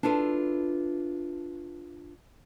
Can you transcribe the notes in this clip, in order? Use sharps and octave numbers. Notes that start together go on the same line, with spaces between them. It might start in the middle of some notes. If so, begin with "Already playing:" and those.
D4 E4 F4 A4 B4